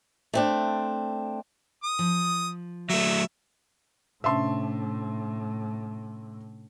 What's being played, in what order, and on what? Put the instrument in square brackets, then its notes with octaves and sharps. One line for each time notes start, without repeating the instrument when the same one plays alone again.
[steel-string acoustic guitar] A3 C4 D4
[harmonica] D#6
[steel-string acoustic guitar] F3
[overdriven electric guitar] F#3 A3 [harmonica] E5
[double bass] A2 [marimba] C3 C#4 D4 [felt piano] E5 A5 C6